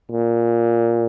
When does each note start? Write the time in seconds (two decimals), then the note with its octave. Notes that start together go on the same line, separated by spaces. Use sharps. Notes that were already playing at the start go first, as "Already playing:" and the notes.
0.12 A#2